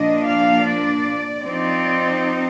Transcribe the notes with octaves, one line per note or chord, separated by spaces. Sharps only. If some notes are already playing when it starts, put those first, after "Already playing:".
Already playing: A#2 F3 A#3 D4 D#5
F5
D5
F3 C4 D#4 D5